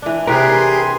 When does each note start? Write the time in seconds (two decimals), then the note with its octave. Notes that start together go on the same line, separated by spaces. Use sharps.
0.02 E3 D4
0.27 C3 E3 G4 G#4 A#4 B4 C6